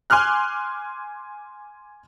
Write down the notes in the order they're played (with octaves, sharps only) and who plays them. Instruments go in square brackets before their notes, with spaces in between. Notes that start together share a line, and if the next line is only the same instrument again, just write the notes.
[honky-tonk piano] G#5 C6 D6 F6 F#6